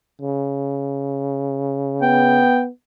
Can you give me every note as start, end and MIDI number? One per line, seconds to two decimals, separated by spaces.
0.21 2.48 49
2.02 2.69 59
2.02 2.61 79